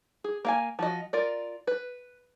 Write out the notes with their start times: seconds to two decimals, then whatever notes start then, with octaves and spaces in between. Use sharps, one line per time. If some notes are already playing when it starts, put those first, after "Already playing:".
0.24 G#4
0.45 A#3 F5 G#5
0.79 F3 F#4 D#5
1.13 F4 A#4 D5
1.67 B4